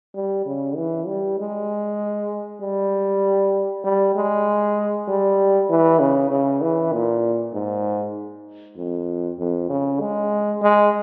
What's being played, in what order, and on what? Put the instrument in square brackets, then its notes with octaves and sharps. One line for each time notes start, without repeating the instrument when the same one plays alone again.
[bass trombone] G3
C#3
E3
G3
G#3
G3
G3
G#3
G3
E3
C#3
C#3
E3
A#2
G#2
F2
F2
C#3
G#3
G#3